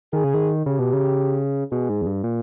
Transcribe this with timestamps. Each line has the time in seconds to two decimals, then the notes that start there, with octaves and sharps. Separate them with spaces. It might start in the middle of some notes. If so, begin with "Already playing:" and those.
0.13 D#3 G#4
0.24 C#3
0.34 D#3
0.66 C#3 G4
0.79 B2
0.93 C#3
1.71 B2 G#4
1.89 G#2
2.02 E2
2.06 G2
2.24 A#2